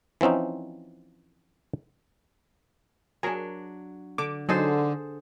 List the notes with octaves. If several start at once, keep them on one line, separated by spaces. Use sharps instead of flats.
E3 F3 C4 C#4 D#4
F#3 D4 G#4 A#4
D3 D6
D3 F#3 D#4 G#4 A4 C5